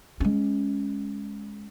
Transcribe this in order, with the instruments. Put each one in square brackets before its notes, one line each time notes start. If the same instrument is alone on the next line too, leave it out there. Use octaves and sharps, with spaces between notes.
[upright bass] G#3 C#4